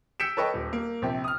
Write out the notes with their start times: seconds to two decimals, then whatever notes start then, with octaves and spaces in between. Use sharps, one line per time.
0.20 E6 G6 B6 C#7 D7 E7
0.37 A4 B4 C#5 D#5 G5
0.54 D#1
0.73 A#3
1.02 A#1 C3 G4
1.24 D#6 F6